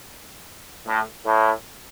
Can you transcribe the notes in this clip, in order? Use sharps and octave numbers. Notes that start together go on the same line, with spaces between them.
A2
A2